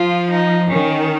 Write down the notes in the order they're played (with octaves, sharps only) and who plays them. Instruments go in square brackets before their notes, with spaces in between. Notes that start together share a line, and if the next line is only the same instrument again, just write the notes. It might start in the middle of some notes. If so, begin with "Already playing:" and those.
Already playing: [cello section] F3 [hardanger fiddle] F4
[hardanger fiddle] D#4
[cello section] D#3 [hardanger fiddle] C#4